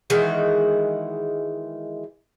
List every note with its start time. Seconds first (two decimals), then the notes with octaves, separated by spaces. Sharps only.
0.10 D#3 E3 G#3 F#4